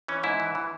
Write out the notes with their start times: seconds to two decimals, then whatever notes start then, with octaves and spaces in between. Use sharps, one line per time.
0.08 E3 C#4
0.23 G#2 E4
0.40 E3
0.55 E3